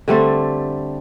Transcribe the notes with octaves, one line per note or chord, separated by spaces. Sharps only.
D3 G3 A3 C4